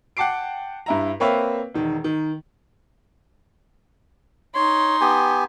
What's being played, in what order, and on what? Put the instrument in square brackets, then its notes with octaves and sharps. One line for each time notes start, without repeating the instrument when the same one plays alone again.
[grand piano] F#5 G5 A5 D6 C7 D7
G2 E4 A#5
A#3 C4 B4 C#5 E5 F5
E1 D#3
D#3
[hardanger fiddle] D#4 C6 [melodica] C#5
[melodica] B3 G4 G#5